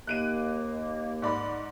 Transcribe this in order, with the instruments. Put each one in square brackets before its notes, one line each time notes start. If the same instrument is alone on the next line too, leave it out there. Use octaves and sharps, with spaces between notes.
[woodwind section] D#2 A#3 [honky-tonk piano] F#6 D7 D#7
[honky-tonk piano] G#2 D5 B5